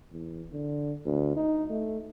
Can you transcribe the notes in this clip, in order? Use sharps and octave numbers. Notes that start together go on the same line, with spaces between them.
E2
D3
D2
D#4
A3